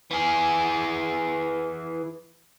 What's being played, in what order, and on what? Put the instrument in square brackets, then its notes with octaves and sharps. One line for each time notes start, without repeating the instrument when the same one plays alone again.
[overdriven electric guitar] E3 G#4